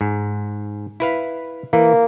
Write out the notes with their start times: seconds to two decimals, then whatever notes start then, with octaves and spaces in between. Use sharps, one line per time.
0.01 G#2
1.00 E4 B4 F5
1.73 E3 A#3